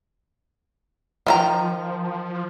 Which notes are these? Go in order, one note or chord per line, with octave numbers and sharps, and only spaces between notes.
D#3 F3 F4 A#5